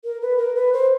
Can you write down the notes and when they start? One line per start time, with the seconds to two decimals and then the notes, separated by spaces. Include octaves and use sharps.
0.04 A#4
0.22 B4
0.38 A#4
0.56 B4
0.73 C5